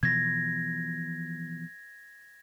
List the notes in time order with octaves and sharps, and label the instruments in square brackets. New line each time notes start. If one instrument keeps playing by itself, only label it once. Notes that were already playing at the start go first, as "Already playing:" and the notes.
[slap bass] B2 E3 F3 [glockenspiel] G#6 A#6